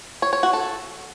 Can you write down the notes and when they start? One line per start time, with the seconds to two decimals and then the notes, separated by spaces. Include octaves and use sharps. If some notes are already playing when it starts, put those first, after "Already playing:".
0.22 C#5
0.33 C#5
0.43 F#4
0.53 A4